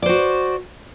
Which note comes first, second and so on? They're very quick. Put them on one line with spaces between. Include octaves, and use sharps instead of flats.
D5 C5 F#4